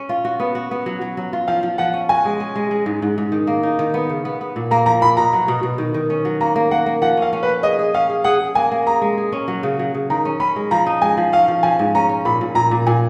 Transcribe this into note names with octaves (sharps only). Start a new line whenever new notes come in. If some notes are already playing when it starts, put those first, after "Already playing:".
Already playing: C#4
F4
F#4
B3
F#4
B3
F#3
F#3
F#3
F4
F3 F5
F3
F3 F#5
C#4
F#4 G#5
G#3
C#4
G#3
G#3
G#2
G#2
G#2
D#3
A#3
D#4
D#3
B3
C#3
B3
B3
A#2
A#3 A#5
F3 A#5
A#2 B5
B2 A#5
F#3
B2
B2
D#3
D#3
C#4
F#3
A#3 A#5
A#3
A#3 F#5
A#3
F3 F#5
C#4 F5
C#4
B4
C#4
G#4 D#5
G#4
C#4 F5
G#4
G#4 F#5
G#4
A#3 G#5
A#3
G#4 A#5
G#3
G#4
C#4
F#3
C#3
F#3
C#3
D#3 A#5
C#4
C#4 B5
G#3
F3 A#5
D#4
G#3 G#5
F3
C#4 F5
F3
F3 G#5
G#2
C#4 A#5
C#4
A#2 B5
A#2
A#2 A#5
A#2
A#2 G#5